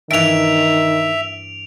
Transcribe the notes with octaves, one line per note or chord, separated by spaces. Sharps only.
G2 D#3 E3 E5 D7 F7